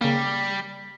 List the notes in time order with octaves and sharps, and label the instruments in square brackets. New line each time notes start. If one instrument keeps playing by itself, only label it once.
[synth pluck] C#3 A#3 [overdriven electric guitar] G3